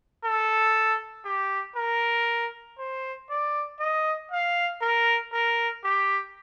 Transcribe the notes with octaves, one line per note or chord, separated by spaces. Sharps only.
A4
G4
A#4
C5
D5
D#5
F5
A#4
A#4
G4